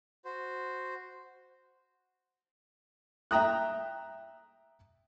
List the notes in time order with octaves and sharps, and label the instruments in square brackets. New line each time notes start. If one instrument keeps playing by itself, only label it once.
[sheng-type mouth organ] F#4 C5
[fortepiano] E5 G5 A#5 D#6 F#6